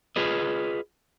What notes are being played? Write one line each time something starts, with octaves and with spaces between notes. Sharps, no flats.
F4 G#4 B4 D#5